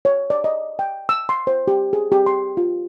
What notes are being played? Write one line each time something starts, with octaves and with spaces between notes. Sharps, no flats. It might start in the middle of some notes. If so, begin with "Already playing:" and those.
C#5
D5
D#5
G5
E6
C6
C5
G4
G#4
G4
C6
F4